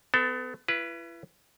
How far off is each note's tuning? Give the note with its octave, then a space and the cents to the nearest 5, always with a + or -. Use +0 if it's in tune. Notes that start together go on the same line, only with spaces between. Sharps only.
B3 +35 A4 +0
E4 +40 B4 -10